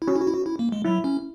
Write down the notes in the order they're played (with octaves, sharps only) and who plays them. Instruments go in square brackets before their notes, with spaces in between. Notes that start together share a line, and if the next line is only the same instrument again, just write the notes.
[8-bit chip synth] E4
[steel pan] C#4 [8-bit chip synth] F#4
[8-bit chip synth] E4
F#4
E4
F#4
E4
A#3
G#3
[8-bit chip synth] F#3 [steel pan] E4
[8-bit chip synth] C#4